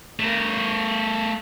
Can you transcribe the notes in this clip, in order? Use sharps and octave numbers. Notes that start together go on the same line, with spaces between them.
A3 A#4